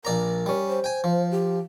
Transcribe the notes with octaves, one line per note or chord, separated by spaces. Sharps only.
A#1 A#4 D5 A#5
G3 C#4
C5
G5 G#5
F3
G4